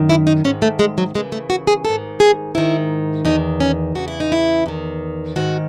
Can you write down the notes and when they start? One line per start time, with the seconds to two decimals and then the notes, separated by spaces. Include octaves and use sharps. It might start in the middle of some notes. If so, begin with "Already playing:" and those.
Already playing: F#2 D#3
0.09 E4
0.27 D#4
0.44 G#2 D#3 C#4
0.62 A3
0.79 G#3
0.98 F#3
1.14 D#2 C#3 E3 G#3
1.32 A3
1.50 F#4
1.67 G#4
1.85 G#2 D#3 A4
2.20 G#4
2.55 G#2 D#3 E4
3.25 E2 D#3 D#4
3.60 C#4
3.95 E2 C#3 E3 F#4
4.08 E4
4.20 D#4
4.32 E4
4.66 E2 D#3
5.36 G#2 D#3 F#4